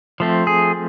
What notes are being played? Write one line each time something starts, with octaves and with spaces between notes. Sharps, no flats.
F3 A3 C4
G#4